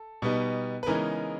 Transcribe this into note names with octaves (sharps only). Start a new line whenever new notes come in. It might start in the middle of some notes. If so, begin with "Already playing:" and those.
Already playing: A4
B2 G3 B3 D#4
B4
C#3 E3 G#3 B3 D#4 A#4